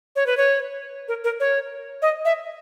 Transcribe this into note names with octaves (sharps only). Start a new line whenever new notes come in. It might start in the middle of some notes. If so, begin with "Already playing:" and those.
C#5
B4
C#5
A#4
A#4
C#5
D#5
E5